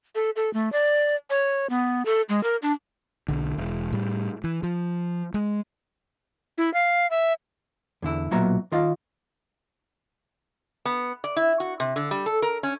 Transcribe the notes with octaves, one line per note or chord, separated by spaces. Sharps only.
A4
A4
A3
D5
C#5
B3
A4
G#3
A#4
D4
B1 D3
E1
A2 G3
E3
F3
G#3
E4
F5
E5
E2 D3 E4
B1 A#2 F#3 B3 E5 A#5
D#3 F4 D#5 F5
B3
D5
E4
F#4
C3
D3
G3
A4
A#4
C#4